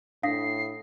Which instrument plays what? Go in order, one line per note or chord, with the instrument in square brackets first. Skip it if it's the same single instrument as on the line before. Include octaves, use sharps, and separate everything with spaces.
[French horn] A2 [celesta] D4 D#6 A#6 [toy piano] F5 [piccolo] C7